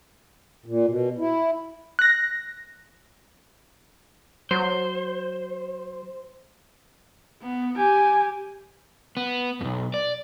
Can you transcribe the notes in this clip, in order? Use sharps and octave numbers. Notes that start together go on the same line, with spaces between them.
A#2
B2
E4
F#6 A#6
F#3 C5
B3
G4 G#5
B3
B1 F2
D5